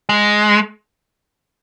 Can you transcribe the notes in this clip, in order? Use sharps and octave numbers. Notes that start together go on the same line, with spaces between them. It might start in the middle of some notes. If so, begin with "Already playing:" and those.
G#3